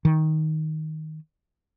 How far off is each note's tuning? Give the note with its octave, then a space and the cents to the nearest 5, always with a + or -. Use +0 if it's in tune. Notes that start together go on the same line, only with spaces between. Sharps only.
D#3 +10